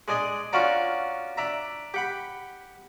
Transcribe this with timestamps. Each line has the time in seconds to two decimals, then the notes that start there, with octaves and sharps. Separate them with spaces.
0.08 G#3 D4 G#4 D#5 D#6
0.53 C#4 D4 F4 F#4 D5 A#5
1.37 D4 E5 A#5
1.94 G4 F#5 B5